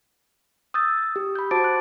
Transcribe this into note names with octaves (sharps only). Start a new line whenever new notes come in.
D#6 E6 G6 A6
G4
B5 G6
F#4 C5 A5 D6 A6 D7
F#6